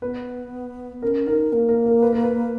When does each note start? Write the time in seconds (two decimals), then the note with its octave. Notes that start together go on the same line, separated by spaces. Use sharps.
0.02 B3 B4
1.02 C#4 A#4
1.27 D#4 A#4
1.52 A#3 A#4
1.69 A#4
1.86 A#4
2.02 B4
2.13 A#4
2.23 B4